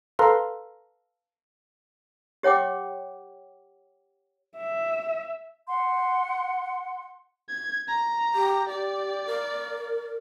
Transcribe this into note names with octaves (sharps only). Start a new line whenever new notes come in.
A4 B4 F5 A#5 C6
G4 C#5 F#5 G5 D6
E5
F#5 C6
G#6
A#5
G4
G4 D5
A#4